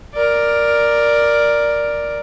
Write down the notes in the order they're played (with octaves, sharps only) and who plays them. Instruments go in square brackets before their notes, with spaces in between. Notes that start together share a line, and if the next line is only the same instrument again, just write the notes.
[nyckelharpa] A#4 D5